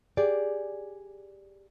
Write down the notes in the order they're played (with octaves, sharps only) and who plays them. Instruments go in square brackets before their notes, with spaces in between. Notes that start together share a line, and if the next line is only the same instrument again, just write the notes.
[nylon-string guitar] G4 G#4 D5